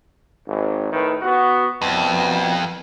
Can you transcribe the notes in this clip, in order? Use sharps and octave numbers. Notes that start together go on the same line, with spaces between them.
G#1
A2 D#3 B4
B3 F#4
C2 F2 B2